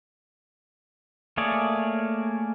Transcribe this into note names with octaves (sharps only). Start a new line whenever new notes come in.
A3 A#3 G#4 C#5 D5